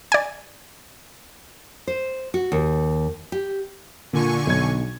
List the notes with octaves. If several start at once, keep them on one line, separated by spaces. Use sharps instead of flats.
D5 G#5
C5
F#4
D#2
G4
A#2 D3 G#5 C#6
B1 G#6